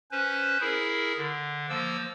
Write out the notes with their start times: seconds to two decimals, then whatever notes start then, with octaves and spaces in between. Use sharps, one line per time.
0.11 C#4 B4 C5
0.61 E4 G#4 A#4
1.17 D3
1.69 F3 A#3 C5 E6